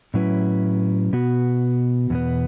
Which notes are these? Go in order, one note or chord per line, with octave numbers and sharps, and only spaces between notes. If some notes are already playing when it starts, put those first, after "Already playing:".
A2 F#3 C#4 E4 B4
B2 B3 F#4
E2 B2 B3